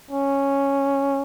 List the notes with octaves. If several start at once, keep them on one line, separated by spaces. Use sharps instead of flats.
C#4